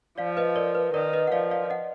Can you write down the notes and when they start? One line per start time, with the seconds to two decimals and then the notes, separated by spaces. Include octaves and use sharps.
0.18 F3 D5 F5
0.37 B4 D#5
0.56 A#4 D5
0.75 B4
0.94 D#3 A#4 D5
1.13 B4 D#5
1.27 F#5
1.32 F3 D5 F5
1.51 D5 F5
1.70 D#5 F#5